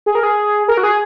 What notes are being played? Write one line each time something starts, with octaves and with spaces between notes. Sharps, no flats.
G#4
A#4
G#4
A#4
F#4
G#4